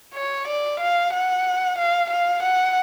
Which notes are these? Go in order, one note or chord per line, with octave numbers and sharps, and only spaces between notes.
C#5
D5
F5
F#5
F5
F5
F#5